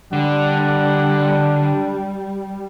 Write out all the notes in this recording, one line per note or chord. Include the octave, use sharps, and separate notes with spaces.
D3 G3 D4 D5 F#5